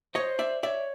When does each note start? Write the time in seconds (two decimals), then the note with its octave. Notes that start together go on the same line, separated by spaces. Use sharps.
0.15 C5 C#5 D#5
0.39 D5 E5
0.63 C#5 D5 E5